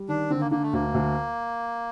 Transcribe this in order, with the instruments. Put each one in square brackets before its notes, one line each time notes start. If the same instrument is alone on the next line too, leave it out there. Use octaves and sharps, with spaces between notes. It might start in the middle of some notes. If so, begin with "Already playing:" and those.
Already playing: [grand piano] G3
[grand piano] D#3 [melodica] D4
[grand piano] D3 [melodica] C4
[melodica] A#3
[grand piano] D3 [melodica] A#3
[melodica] A3
[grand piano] D2 [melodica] A#3
[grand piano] D2